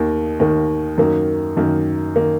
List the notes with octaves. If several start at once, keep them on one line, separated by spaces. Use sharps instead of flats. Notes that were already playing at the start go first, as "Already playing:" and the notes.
Already playing: D#2 D#3 A#3
D#2 D#3 A#3
F#2 D#3 A#3
F#2 D#3 A#3
D#3 A#3